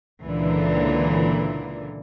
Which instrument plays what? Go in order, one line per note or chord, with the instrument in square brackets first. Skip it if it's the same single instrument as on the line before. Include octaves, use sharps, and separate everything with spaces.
[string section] C#2 A#2 D3 E3